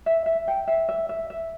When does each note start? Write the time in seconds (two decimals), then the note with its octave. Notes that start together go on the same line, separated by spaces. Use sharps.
0.06 E5
0.26 E5
0.48 G5
0.67 E5
0.89 E5
1.09 E5
1.30 E5